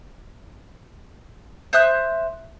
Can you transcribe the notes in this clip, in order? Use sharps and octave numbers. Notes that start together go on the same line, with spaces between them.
C5 E5 D#6 F#6